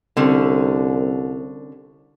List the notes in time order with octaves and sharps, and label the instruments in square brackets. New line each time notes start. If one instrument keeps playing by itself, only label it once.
[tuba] C2 [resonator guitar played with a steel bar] D3 C4 C#4